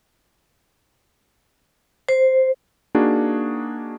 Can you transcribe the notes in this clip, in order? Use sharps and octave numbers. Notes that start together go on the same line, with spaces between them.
C5
A#3 D4 D#4 F#4 G#4